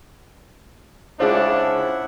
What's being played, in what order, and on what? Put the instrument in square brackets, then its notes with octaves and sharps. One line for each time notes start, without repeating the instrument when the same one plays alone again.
[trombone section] C#3 D4 [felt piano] G#3 F4 [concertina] E4 E5 F#5 [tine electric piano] C5